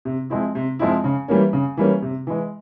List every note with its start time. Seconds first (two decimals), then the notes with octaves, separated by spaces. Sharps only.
0.05 C3
0.30 F3 G#3 C4 E4
0.55 C3
0.79 F3 G#3 C4 E4
1.04 C#3
1.28 E3 G3 A#3 C#4
1.53 C#3
1.77 E3 G3 A#3 C#4
2.02 C3
2.27 E3 G#3